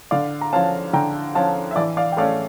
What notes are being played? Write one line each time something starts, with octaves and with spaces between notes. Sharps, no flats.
D3 D5 F5
A#5
F3 C#4 F5 A5
D3 G5 A#5
F3 C#4 F5 A5
E5
E3 D5
D5 F5
G5
A3 C#4 D5 F5